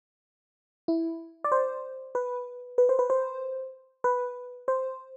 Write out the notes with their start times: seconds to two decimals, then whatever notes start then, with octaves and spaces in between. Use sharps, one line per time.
0.88 E4
1.44 D5
1.52 C5
2.15 B4
2.78 B4
2.89 C5
2.99 B4
3.10 C5
4.04 B4
4.68 C5